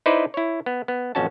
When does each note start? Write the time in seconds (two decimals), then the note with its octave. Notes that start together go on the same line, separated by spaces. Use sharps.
0.06 D#4 E4 B4 C5 D5
0.34 E4 C#5
0.66 B3
0.88 B3
1.15 A1 F2 C#4 F#4 A5